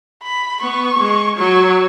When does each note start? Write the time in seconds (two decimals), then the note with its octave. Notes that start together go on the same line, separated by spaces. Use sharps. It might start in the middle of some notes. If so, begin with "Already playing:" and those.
0.23 B5
0.62 B3 C#6
0.99 G#3
1.37 F#3 C#6